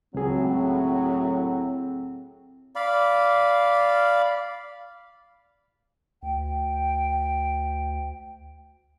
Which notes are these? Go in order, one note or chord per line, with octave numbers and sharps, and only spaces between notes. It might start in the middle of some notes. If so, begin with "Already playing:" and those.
C#2 A2 F#3 C4 G#4
D5 F5 B5
D2 G5